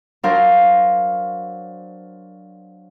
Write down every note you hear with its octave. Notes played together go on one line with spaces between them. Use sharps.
F#3 D4 A#4 C5 F5